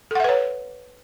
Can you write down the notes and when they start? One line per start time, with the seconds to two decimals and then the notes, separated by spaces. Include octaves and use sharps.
0.11 A4
0.15 F#5
0.20 E5
0.24 B4
0.29 C#5